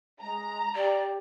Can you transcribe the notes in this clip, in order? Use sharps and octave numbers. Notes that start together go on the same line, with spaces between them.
G#3 A#5
G4 D5